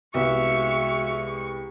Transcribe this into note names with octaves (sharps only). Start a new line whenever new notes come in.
C2 G#3 B3 F#4 E5 F5 C#6